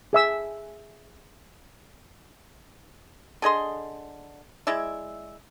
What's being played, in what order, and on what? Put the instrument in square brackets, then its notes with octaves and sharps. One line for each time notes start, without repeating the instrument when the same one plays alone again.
[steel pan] G#4 E5 E6
[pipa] D3 G#4 D#5 C6
G#3 E4 D5 E5